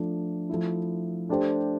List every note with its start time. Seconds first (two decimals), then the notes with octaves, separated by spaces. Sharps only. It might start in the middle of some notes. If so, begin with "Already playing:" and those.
Already playing: F3 A3 D4
0.49 F3 A3 E4
1.29 A3 D4 G4 C5